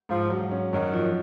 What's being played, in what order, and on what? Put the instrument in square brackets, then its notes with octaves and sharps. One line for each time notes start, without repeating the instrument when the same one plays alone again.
[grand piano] G#2 [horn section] F3
[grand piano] F#3
C#4
[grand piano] F#2 [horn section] D#3 F#3
[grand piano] F3